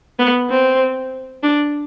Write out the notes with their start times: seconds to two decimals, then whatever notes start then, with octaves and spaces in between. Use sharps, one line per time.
0.19 B3
0.50 C4
1.43 D4